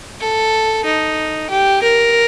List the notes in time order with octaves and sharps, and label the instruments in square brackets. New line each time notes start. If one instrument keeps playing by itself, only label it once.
[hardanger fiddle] A4
D#4
G4
A#4